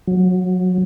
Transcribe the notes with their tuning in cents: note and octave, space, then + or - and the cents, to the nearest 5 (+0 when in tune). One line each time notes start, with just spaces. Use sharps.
F#3 -20